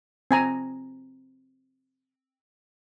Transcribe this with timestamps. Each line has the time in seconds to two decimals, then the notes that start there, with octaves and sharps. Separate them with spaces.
0.31 C4 G#5 A#5